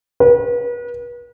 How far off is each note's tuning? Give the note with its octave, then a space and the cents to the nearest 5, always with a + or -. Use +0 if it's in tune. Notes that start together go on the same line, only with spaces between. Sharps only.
B4 -40